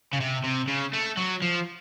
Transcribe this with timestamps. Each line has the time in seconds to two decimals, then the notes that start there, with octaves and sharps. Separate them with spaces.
0.13 C#3
0.20 C3
0.44 C3
0.68 C#3
0.93 A3
1.17 F#3
1.42 F3